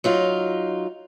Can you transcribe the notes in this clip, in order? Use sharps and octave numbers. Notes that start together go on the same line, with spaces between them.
F#3 D#4 F4